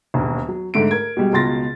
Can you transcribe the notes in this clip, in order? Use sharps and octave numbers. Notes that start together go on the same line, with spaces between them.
E1 D#2
F#3
G#2 D3 A3 D7
A#4 G#6
B2 G3 G#3
C#2 B2 C6 A6 A#6